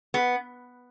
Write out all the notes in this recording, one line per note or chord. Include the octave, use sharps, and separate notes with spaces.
B3